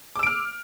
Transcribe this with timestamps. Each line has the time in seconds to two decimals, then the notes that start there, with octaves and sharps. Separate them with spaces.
0.16 D6
0.19 E6
0.23 D7
0.27 F6